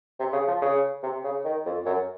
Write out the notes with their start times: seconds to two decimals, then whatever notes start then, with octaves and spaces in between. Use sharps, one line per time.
0.19 C3
0.33 C#3
0.47 F3
0.62 C#3
1.03 C3
1.24 C#3
1.45 D#3
1.66 F2
1.86 F#2